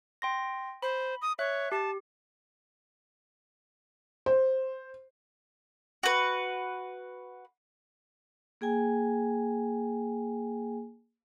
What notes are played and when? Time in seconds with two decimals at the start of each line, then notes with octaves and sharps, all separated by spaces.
0.22 G5 C6 A#6
0.82 C5 B5
1.22 D#6
1.39 C#5 E5 F#6
1.72 G4 A5
4.26 C5
6.03 F#4 B4
8.61 A#3 G#4 G5 G#5